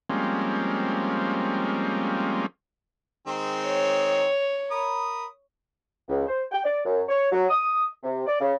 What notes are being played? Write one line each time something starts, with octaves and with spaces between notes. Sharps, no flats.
F3 G3 G#3 A#3 C4 C#4
D#3 G#3 C4
C#5
A#4 B5 D#6
C#2
C5
G5
D5
F#2
C#5
F#3
D#6
C3
D5
C#3